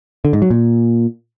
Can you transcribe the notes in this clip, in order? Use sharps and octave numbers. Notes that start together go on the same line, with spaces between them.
D3
G#2
F#3
A#2